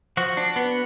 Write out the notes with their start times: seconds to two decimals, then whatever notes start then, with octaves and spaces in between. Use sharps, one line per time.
0.17 F3 F#4
0.37 D4
0.56 B3